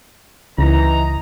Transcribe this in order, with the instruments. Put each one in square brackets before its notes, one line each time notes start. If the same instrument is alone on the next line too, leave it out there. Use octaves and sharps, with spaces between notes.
[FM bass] C#2 [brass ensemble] E3 D#4 A#5